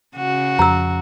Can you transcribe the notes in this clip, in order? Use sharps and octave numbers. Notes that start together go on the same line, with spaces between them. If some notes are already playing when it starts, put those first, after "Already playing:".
C#3 F#4
F2 A#5 E6